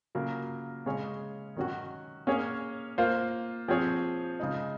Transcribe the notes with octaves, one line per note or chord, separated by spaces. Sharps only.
C#3 F#3 A#3 F4 A#4
C#3 G#3 C#4 G#4 C#5
D#3 F#3 C#4 F#4
A#3 C#4 G#4 C#5
A#3 F4 C5
F3 C4 F4 G#4 C#5
C#3 G#3 D#4